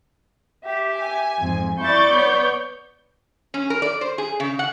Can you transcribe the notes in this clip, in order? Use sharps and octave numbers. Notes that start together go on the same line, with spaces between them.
G4 E5
G#5
F2 G#2
E4 D5 C#6 G6 A6
B3 C#5
C#4
A#4
D5
C5
G#4
C#3
F#5